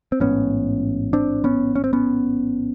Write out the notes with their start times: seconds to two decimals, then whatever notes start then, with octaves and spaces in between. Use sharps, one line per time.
0.12 C4
0.20 A1 G#2 B3 C#4
1.13 C4 D4
1.44 B3 C#4
1.75 C#4
1.84 C4
1.93 B3 C#4